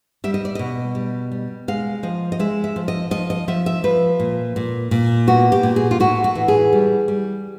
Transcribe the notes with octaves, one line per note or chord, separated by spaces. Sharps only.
G3 E5
D#5
D5
B2 D#5
G3
G3
G#3 F5
F3 D#5
D#5
G#3 E5
E5
F3
D#5
F3 D#5
D#5
F3 E5
E5
F3 B4
A#2
A#2
A#2
B3 F#4
G4
A#2
G#4
F4
A2 F#4
F#4
E3
G#4
G3
G3